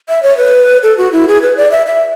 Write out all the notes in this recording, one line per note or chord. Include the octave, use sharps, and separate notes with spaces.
E5
C#5
B4
A4
F#4
E4
G#4
B4
D5
E5
E5